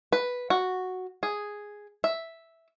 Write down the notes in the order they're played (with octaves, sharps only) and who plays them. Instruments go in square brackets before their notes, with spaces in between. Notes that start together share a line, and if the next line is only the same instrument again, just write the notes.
[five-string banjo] B4
F#4
G#4
E5